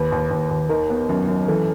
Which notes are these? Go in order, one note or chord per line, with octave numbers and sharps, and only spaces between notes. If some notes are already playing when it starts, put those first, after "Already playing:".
Already playing: D#2 B4
D#2
D#2
D#2
D#3 A#4
B3
F#2
F#2
E3 A4